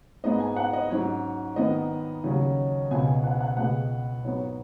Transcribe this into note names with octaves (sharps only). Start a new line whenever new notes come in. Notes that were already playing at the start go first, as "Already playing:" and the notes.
G#2 G#3 B3 D#5
G#5
F#5
D#5
G#2 F#3 C#4 C#5
G#2 D#3 B3 D#5
D#2 C#3 F#3 C#4
C#2 B2 B3 G#5
G#5
F#5
F#5
C#2 B2 G#3 B3 F#5
G#2 F#3 B3 C#5